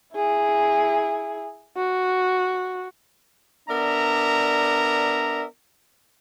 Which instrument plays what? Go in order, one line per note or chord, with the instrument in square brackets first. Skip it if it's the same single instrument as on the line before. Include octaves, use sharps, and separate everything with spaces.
[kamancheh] E4 G#4
F#4
[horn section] B3 D4 A#4 D5 E5 A#5